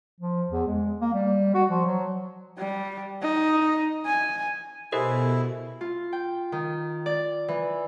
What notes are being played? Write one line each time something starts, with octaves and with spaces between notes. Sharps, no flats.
F3
E2
G#3
A#3
G3
F#4
F3
F#3
G3
D#4
G#5
B2 E4 G4 A4 A#4 C5 D#5 G#5
F4
G5
D#3
D5
E3